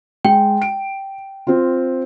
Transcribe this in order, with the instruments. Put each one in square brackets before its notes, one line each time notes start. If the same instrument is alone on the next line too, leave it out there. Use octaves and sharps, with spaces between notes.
[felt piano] G#3 [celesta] G5
[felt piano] D7
C4 F4